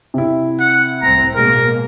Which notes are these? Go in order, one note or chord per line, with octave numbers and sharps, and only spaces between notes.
C3 E4
F#5
C2 A2 C4 A#5
B2 G#3 A#3 A#4